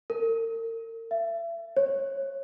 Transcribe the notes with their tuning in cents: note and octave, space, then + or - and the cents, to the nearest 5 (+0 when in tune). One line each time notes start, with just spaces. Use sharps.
A#4 -40
E5 +35
C#5 -20